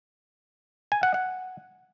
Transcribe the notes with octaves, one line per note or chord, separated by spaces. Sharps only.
G#5
F#5
F#5